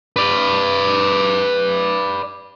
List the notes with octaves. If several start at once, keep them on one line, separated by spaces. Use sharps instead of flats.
B4 D5